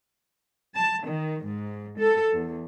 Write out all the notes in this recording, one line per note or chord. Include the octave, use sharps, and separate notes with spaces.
A5
D#3
G#2
A4
E2